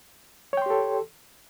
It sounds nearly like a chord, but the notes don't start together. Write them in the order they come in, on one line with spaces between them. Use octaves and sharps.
C#5 G5 C6 G4 A4